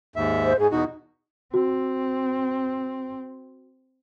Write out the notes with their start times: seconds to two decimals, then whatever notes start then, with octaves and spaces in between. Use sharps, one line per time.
0.16 D#2 G#2 E5
0.45 C5
0.59 G#2 G#4
0.71 E2 B2 D#4 F#4
1.54 C4 F#4